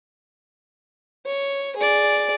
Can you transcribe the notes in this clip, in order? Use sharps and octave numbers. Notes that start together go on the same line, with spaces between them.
C#5
G#4 D5